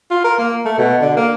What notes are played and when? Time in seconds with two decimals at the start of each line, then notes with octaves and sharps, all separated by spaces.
0.11 F4
0.24 A#4
0.38 A#3
0.65 A3
0.78 B2
1.01 D3
1.17 A#3